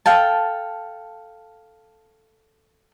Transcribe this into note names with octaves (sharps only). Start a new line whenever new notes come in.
A4 F5 G5 A5